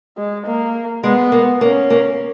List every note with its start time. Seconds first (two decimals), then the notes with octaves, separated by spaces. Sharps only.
0.17 G#3
0.46 A#3
1.04 G#3 B3
1.32 A#3
1.61 A#3 C#4
1.90 A#3